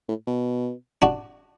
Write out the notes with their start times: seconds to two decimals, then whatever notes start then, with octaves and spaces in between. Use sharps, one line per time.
0.08 A2
0.27 B2
1.02 D4 F#4